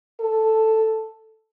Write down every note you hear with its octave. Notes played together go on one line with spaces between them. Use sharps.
A4